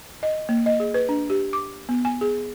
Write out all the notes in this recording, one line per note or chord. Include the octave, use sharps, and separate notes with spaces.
D#5
A#3
D#5
G#4
B4
D4
G4
D6
B3
G#5
G#4